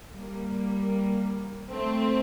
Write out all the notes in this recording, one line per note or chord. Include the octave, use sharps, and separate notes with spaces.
G3 A#3
A3 C4